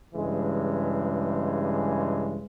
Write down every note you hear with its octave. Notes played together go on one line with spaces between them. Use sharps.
G2 C#3 E3 G#3